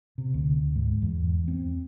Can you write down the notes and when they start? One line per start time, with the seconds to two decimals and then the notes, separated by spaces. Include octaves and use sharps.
0.18 C3
0.34 D2
0.75 G#2
1.02 E2
1.48 C4